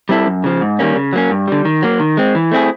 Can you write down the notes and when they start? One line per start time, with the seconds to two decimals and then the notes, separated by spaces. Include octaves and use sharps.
0.09 G3 C4 E4 A4
0.26 F#2
0.44 C#3 F3
0.61 G#2
0.79 D#3 G3 A#3 C#4
0.96 C#3
1.13 F#3 A#3 C#4
1.30 G2
1.48 D3 G3
1.65 D#3
1.82 F#3 A#3
2.00 D#3
2.17 G#3 C4
2.35 E3
2.51 A3 C4 E4 G#4